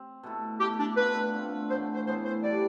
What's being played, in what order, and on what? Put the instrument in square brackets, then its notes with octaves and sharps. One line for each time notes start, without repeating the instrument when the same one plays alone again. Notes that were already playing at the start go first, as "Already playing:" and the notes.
Already playing: [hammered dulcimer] C4
B2 A3 E4 A4
[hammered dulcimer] B2 A3 E4 A4 [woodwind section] G4
[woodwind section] D4
[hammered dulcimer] D3 A3 C4 F4 [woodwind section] B4
[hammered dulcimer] D3 A3 C4 F4
[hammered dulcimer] A2 E3 B3 [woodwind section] C5
[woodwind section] C5
[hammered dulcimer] A2 E3 B3 [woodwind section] C5
[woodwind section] C5
[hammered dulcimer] E3 G3 D4 G4 [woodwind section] D5